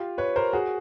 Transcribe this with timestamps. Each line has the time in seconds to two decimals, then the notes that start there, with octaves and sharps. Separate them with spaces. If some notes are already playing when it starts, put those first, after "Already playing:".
Already playing: F4 G4
0.18 B4 C#5
0.36 A#4 C5
0.53 F#4 G#4